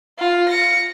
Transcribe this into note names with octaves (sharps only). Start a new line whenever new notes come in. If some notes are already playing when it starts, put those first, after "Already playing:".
F4
A#6 C#7